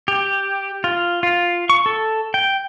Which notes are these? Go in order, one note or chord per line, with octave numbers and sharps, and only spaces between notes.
G4
F4
F4
C#6
A4
G5